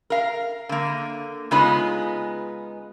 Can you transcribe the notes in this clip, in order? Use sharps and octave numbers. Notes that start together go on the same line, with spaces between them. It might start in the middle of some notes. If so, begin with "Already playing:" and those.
A#4 F5
D3 A#3
C#3 G#3 B3 D#4 F4 B4